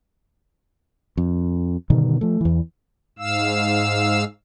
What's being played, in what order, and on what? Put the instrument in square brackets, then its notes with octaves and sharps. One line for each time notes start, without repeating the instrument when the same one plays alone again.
[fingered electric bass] F2
G2 B2 D3 D#3
F3 A3
E2 E3
[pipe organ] G#2 F5 E6